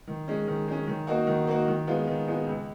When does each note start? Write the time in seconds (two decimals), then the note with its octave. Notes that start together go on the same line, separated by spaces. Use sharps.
0.07 D#3
0.28 G#3 C#4
0.47 D#3
0.68 G#3 C#4
0.87 D#3
1.07 A#3 D#4 F#4
1.27 D#3
1.47 A#3 D#4 F#4
1.67 D#3
1.87 G#3 B3 F4
2.07 D#3
2.27 G#3 B3 F4
2.47 C#2